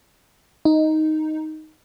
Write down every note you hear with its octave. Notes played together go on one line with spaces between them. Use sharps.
D#4